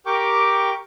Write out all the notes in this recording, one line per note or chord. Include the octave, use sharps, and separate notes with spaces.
G4 A#4 G5 C#6 D6